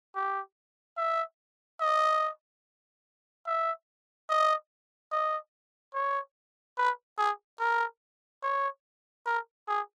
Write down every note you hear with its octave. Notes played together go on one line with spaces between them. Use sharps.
G4
E5
D#5
E5
D#5
D#5
C#5
B4
G#4
A#4
C#5
A#4
G#4